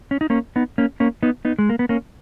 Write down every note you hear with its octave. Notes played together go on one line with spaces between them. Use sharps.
C#4
D#4
A#3 C#4
B3 D#4
A#3 C#4
A#3 C#4
B3 D#4
B3 D#4
G#3
A#3
B3
A#3 C#4